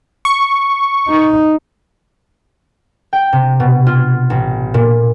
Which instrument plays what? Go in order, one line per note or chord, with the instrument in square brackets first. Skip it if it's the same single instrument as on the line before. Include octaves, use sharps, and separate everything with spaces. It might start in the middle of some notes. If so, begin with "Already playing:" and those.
[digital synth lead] C#6
[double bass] D#4
[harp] G5
C3
B2
F4
A1
A#2